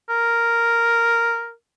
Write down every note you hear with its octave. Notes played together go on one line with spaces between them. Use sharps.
A#4